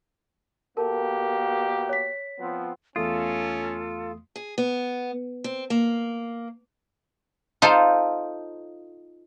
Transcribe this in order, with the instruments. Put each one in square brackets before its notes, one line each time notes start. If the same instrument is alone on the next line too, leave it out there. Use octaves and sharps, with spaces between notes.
[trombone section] B2 A#3 G4 [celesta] A4 A#4 A5
[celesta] C#5 B6
[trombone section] F3 B3 C4
[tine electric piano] E2 A3 D#6 [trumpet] C#4 [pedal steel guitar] F4 [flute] A4
[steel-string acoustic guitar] G#4
B3
C4
A#3
[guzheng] D#4 F4 A4 C5